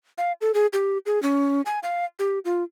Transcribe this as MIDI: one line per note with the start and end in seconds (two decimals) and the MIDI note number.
0.18 0.33 77
0.41 0.52 69
0.54 0.67 68
0.73 0.98 67
1.06 1.21 68
1.23 1.62 61
1.66 1.79 80
1.83 2.05 77
2.19 2.39 67
2.45 2.63 65